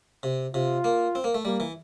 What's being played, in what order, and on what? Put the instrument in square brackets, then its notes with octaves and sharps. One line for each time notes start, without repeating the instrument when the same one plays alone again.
[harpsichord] C3
[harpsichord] C3 [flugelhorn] F4
[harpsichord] A#3
C4
A#3
A3
[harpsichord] G3 [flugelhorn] A#3
[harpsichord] E3